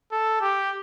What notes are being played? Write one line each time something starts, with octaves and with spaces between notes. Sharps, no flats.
A4
G4